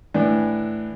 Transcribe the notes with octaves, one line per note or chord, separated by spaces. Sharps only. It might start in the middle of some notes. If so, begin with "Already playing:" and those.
A2 E3 D4